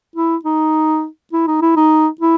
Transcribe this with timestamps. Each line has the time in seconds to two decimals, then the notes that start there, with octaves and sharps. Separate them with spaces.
0.16 E4
0.44 D#4
1.33 E4
1.47 D#4
1.62 E4
1.76 D#4
2.21 E4